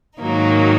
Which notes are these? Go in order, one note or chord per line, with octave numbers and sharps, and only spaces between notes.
G#2 D#3 F#3 A#3 D#4